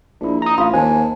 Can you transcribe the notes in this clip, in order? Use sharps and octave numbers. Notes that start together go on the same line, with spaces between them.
A#1 D4 E4
A#5 D#6
A1 F4 F5 B5
D#2 C5 G#5 A5